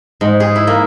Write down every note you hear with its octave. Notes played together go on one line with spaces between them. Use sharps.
G#2
G#4
E4
A#3